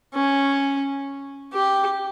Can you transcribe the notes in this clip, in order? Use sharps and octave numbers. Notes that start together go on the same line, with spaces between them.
C#4
G4